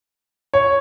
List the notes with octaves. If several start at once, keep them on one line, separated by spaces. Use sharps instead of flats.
C#5